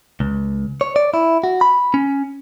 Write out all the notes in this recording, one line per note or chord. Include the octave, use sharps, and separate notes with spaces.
C#2
C#5
D5
E4
F#4
B5
C#4